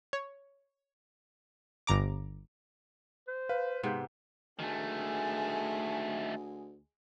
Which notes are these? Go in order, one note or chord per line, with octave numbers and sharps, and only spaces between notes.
C#5
G1 A#5 D6
C5
B4 F5
G#2 C3 B3 C6 G6
D2 D#3 G#3 A3 G#5